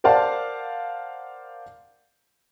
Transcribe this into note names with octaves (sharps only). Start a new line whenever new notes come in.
A#4 C5 D5 F5 F#5 A5